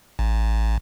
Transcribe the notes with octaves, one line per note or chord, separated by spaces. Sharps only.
A1